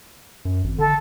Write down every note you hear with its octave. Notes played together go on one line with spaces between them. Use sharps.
F#2
G#1
D3 A4